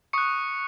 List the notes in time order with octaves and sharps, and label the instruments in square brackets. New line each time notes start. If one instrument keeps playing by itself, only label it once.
[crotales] C#6 D#6 F#6 C#7